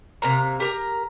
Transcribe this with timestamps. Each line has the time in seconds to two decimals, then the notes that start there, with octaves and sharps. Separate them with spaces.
0.22 C3 A#3 A#5
0.60 G4 A#4 A#5